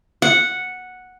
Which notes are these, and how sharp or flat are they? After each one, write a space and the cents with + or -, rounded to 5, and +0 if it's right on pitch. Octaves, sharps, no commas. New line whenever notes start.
F#5 -5